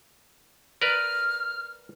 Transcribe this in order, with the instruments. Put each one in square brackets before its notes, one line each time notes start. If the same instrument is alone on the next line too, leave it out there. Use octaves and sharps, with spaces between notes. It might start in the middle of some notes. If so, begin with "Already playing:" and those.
[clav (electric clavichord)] A#4 B4 D5 [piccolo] F6